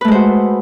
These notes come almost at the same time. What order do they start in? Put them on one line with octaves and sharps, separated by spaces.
B4 A3 G#3 C5 F#4